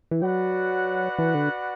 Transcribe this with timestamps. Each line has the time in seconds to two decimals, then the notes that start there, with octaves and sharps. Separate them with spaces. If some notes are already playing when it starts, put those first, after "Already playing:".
0.11 E3
0.22 F#3 F#4 B4 D5 F#5
1.19 E3
1.35 D3